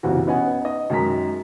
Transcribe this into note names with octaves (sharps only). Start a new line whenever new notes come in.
F#1 B1 C3 E3 F#4
B3 C#4 D#5 F#5 G#5
D#4 D#5
F#2 D#3 G#3 A#4 A#5 B6